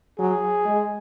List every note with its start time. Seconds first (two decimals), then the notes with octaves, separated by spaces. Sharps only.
0.19 F#3 G#4
0.66 G#3